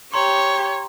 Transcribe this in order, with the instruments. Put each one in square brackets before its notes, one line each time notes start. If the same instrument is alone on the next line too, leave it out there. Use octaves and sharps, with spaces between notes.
[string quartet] G4 [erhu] C#5 [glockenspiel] A#5 C6